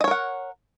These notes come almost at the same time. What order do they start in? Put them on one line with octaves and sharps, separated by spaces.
D#5 C#5 A#4 F#5